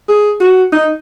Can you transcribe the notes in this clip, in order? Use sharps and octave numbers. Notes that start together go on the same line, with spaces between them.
G#4
F#4
D#4